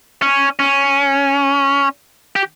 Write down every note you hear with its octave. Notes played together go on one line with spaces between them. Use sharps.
C#4
C#4
G4